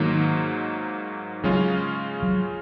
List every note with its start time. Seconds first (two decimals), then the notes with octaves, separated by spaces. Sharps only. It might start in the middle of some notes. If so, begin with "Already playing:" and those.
Already playing: G#2 D#3 F#3 A#3 D#4
1.43 C#3 F#3 G#3 C#4 F4
2.23 F#3